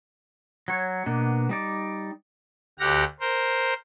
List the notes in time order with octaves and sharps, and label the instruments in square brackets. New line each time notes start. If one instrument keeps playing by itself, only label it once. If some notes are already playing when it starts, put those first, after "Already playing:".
[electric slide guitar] F#3 C#5
B2 A#3 B3 D4
G3 D#4 D5
[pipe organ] D2 G4 F#5 F6 A#6
A#4 C5